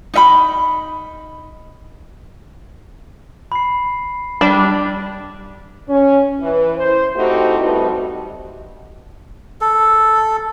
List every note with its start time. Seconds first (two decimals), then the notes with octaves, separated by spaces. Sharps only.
0.14 D#4 E5 B5
3.52 B5 C7
4.41 G3 D4
5.88 C#4
6.40 E3
6.77 C5
7.15 A3 C4 D#4 E4 F#4 G4
7.60 G3 A3 B3 C4 D#4 F#4
9.61 A4